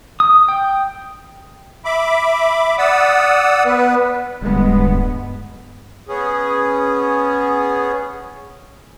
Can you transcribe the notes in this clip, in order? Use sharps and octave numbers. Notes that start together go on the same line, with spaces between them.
D#6
G5
E5 B5 D6
D5 F#5 D#6 E6
B3 B4
D1 G2 G#3 B3
B3 C#4 G#4